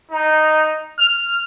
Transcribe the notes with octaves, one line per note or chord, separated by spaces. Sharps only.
D#4
F6